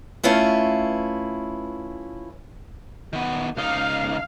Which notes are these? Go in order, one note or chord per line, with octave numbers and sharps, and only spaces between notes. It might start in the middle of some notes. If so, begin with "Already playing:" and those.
A3 C#4 E4 F4 B4
D#3 B3
C#2 D#4 F5